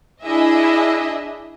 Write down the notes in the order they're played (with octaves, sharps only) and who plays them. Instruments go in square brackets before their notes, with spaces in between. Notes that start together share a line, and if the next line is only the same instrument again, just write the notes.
[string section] D4 E4 G#4 D#5 E5